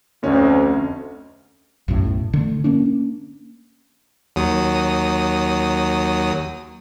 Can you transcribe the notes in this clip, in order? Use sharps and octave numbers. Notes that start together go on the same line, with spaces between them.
F1 D2 C#4
B1 F#2 A2
D3 A3
A#3 C#4 D4
D#2 F#3 D#6